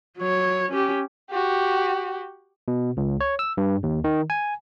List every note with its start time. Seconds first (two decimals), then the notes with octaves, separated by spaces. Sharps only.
0.18 F#3 C#5
0.71 C#4 G4
1.30 F#4 G4
2.68 B2
2.97 C#2
3.21 C#5
3.39 E6
3.57 G2
3.83 D#2
4.04 D#3
4.30 G#5